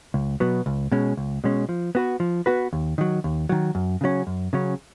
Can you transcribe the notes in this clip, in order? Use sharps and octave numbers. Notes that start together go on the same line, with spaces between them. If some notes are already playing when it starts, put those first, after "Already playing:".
C#2
B2 F#3 B3
C#2
B2 G#3 C#4
C#2
B2 G#3 C#4
F3
B3 F#4 B4
F3
B3 F#4 B4
D#2
D#3 F#3
D#2
D#3 F#3
F#2
C#3 F#3 C#4
F#2
C#3 F#3 C#4